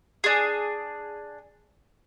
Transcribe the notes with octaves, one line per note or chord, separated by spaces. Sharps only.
D4 G#4